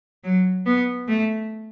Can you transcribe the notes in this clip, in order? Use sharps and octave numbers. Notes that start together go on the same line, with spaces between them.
F#3
B3
A3